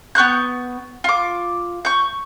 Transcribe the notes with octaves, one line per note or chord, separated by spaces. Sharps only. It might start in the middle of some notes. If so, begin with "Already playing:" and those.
B3 C#6 F#6 G6
F4 D6
C#6 G6